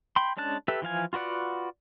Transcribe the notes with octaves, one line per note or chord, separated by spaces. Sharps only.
G5 B5 C6
G#3 C#4 D4 A5 F#6
G4 A4 B4 E5
E3 F3 F5 G#5
F4 F#4 B4 D5 F#5